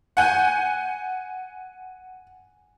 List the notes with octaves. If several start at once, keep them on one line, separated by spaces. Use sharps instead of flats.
F#5 G#5 G6